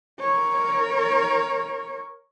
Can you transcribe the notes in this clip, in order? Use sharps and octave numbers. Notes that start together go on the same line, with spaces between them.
A#4 C#5